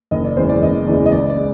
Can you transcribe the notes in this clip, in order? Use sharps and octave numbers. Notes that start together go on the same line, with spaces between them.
F#1 D#5
D5
E2 C#3 E3 G#3 C5
D5
F#1 D#5
E2 C#3 E3 G#3 D5
D#5
C#2 D5
D5
G#3